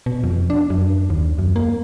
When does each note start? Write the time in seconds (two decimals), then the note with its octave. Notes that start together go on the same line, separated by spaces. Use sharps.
0.06 B2
0.23 F2
0.50 D4
0.70 F#2
1.10 D#2
1.38 F#2
1.56 A#3